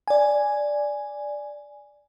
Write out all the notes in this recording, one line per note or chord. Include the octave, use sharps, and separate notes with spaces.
D5 G#5